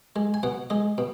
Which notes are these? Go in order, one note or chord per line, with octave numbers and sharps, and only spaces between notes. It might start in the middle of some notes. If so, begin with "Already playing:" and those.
G#3
G#5
B2 F#5
G#3 D#5
B2